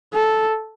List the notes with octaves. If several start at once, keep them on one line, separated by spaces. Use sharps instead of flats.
A4